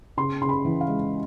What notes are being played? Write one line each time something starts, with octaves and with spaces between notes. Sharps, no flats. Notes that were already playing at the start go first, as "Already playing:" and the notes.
C#3 C6
C#3 C6
B5
E3
F5
G#3